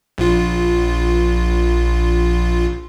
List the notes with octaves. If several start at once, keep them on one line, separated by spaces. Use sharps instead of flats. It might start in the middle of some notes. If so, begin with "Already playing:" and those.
A#1 F4